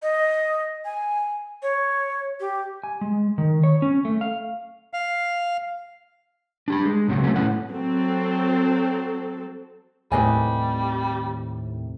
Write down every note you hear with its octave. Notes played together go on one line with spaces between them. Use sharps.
D#5
G#5
C#5
G4
G#5
G#3
D#3
C#5
C#4
A3
F5
F5
D4 G4 B5
G#3
C#2 C3 F#3 F#4
F#3 A3 C#4
A2 B3 C#4 F#5
F#3 C4 A4
D#2 A2 C3 G3 B4 D#5 G#5